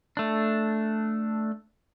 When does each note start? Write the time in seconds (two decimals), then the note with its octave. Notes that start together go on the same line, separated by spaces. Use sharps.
0.17 A3 D4